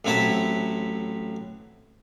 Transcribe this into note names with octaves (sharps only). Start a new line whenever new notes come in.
A1 F#3 C4 E4 E5 A5